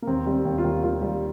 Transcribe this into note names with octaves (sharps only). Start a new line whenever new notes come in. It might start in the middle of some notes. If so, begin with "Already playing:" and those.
A#3
D#2 C4
G3
C4
D#2
F4
D#2
D#2 F4
G3